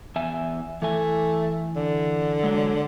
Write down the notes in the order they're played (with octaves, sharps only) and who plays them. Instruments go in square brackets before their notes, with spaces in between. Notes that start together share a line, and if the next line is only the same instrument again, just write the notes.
[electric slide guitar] E2 E5 G#5
[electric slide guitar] E3 G#5 [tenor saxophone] A3
[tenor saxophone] D3
[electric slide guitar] F#3 G#3